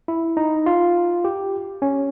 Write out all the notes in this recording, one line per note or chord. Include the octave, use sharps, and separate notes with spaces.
E4
D#4
F4
G4
C#4